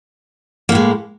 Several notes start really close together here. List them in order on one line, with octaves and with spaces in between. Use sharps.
A#3 A2 G#3